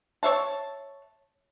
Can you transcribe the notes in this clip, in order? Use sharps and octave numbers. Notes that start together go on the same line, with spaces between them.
C#5 E5 A5